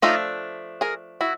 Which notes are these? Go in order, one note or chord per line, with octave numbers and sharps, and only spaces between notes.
F3 A3 D4 D#4 F4
G#4 A#4
E4 F#4